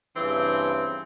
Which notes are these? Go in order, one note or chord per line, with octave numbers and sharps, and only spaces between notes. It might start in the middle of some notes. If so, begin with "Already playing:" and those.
G2 C#3 E3 C4